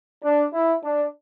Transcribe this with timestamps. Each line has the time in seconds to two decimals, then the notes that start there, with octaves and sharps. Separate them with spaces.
0.23 D4
0.53 E4
0.84 D4